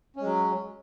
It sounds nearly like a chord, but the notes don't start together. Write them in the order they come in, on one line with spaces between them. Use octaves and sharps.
C#4 G#3 F#3